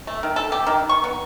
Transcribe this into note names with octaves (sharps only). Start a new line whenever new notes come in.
A3
D#3
A4
G4
D#3
C#6
B3